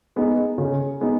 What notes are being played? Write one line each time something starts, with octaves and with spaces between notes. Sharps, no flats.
G#3 B3 D#4
C#3
G#3 B3 D#4